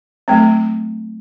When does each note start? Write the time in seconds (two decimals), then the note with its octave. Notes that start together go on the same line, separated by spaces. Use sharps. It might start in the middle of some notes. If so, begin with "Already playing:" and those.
0.28 F#3 A3 C4